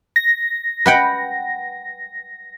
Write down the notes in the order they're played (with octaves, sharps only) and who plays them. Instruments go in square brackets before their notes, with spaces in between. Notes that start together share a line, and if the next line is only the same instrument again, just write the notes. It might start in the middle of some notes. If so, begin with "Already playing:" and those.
[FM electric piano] A#6
[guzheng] B4 F#5 G5